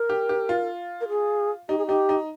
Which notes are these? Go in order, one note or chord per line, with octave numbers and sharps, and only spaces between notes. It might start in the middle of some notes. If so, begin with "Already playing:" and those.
Already playing: A#4
G4
G4
F4
A#4
G#4
D#4 G4
G#4
D#4 G4
D#4